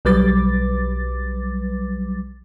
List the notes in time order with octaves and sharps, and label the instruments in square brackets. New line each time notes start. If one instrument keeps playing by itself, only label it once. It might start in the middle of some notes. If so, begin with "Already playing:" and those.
[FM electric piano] B1 F#3 G3 B4 D6 A6